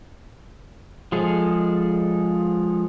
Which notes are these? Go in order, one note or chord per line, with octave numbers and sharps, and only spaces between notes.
F3 G#3 G#4 A4